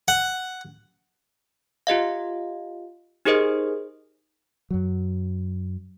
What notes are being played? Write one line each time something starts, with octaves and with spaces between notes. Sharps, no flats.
F#5
F4 G4 D#5 F5
D#4 G4 G#4 A#4 C5 D#5
F#2 F#3